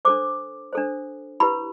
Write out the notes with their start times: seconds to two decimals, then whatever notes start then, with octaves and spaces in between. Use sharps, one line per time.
0.05 D4 A4 C5 D6
0.73 D4 A4 C5
1.40 E4 G4 B4 B5